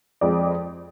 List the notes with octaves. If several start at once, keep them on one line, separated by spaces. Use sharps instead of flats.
F2 F3 G#3 D5